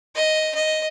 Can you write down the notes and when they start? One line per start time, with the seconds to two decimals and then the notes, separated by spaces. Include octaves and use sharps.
0.15 D#5
0.55 D#5